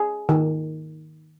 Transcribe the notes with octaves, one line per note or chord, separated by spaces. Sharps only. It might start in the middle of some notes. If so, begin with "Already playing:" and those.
Already playing: G#4
D#3